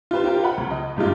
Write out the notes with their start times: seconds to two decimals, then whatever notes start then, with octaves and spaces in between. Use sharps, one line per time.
0.11 F4 G4 B4 C5
0.24 F4 G4 A#4
0.44 F#5 B5
0.57 C#2
0.71 D#5
0.96 F#1 G2 G#3 F4